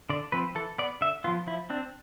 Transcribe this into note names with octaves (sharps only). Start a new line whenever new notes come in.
D3 D5
F3 C4 B4
E3 A4
B3 D5
D3 E5
F3 B3 F4
F3 E4
C4 D4